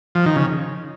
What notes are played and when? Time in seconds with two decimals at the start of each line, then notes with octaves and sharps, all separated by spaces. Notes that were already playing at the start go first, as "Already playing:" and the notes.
0.15 F3
0.26 D#3
0.36 C#3